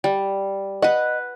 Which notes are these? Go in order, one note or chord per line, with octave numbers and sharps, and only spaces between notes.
G3
B4 D#5 F#5